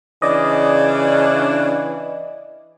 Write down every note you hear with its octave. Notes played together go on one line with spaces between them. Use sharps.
C#3 E3 D4 D5 D#5